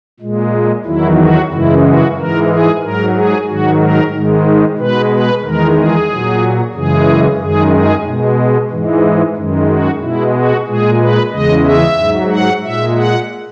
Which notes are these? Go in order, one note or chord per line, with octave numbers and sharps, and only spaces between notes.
A#2 G#3
E2 D#3 F#3 E4
F#4
F#2 C#3 E3 G#3 E4
F#4
G#2 E3 G#3 A#4
G#4
G#2 F#3 A#4
G#4
G#2 D#3 F#3 F#4
A#4
G#2 D#3 G#3
B2 G#3 B4
B4
E2 D#3 G#3 A#4
G#4
A#2 F#3
F#2 C#3 E3 G#3 G#4
F#2 D#3 G#3 G#4
G#4
B2 G#3
G#2 E3 G#3
F#2 D#3 G#3
F#4
B2 G#3 E4
F#4
A#2 G#3 G#4
B4
E2 C#3 G#3 D#5
E5
G#2 F#3
F#5
A#2 G#3 E5
F#5